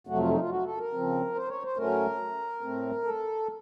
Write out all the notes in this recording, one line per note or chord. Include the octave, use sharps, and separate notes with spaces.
F2 C3 F#3 A3 F#4
F4
D#4
F4
F#4
A4
A#4
C#3 F3 C4
C5
C#5
C5
A2 F#3 A3 C#4 A#4
A2 A3 C4
A4